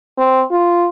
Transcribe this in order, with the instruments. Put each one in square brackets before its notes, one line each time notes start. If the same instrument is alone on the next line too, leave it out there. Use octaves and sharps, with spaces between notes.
[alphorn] C4
F4